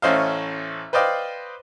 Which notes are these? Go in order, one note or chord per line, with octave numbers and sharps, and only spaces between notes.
A1 A3 C#4 C5 D#5 F5
B4 C5 D5 D#5 F5 G5